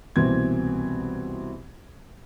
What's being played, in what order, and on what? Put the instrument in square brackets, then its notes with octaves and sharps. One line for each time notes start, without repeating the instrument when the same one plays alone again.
[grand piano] C2 B2 E3 A#3 C4 G#6